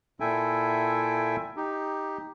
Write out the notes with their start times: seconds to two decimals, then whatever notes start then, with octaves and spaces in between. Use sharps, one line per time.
0.20 A#2 E4 A4 E5 G5 G#5
1.57 D#4 G4